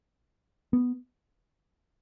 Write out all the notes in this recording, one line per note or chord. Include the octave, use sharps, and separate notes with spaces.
B3